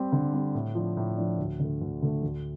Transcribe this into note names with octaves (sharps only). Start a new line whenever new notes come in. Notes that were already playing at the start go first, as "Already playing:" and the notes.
Already playing: G3 C4 G4
D3
G3 C4 G4
A2
F3 D4
A2
F3 D4
D2
D3 A3
D2
D3 A3
D2